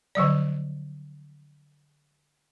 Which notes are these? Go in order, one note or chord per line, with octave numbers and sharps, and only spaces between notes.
D3 F3 F#3 D5